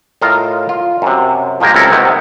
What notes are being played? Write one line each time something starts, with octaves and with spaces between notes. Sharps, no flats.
A2 F4 A#4 D#5 F5
F4
F#2 C3
F3 G#3 A#3 G4 A#4
C#2 C3 E4 A4 A#4
C3 D#3 B3